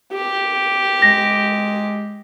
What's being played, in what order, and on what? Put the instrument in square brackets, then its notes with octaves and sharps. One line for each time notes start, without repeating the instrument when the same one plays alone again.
[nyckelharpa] G4
[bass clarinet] G#3 [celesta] A#6